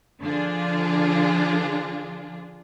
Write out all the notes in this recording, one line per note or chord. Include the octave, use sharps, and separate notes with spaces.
D3 F3 D4 F4 G#4